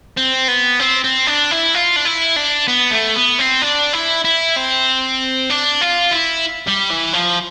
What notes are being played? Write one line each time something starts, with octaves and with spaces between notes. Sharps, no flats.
C4
B3
C4
C4
D4
E4
F4
D4
E4
D4
B3
A3
B3
C4
D4
E4
E4
C4
D4
F4
E4
G3
E3
F3